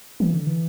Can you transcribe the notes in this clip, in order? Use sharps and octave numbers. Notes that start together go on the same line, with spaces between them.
E3
D3
E3